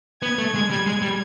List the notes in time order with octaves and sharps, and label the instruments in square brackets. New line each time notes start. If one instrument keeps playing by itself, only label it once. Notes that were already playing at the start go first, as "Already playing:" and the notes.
[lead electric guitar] B3 [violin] G#6
[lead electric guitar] A3
G#3
G3
G#3
G3